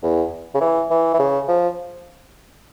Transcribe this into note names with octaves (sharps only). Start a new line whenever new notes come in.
E2
C#3
E3
E3
E3
C#3
F3